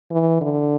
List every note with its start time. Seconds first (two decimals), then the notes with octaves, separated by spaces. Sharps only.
0.11 E3
0.41 D3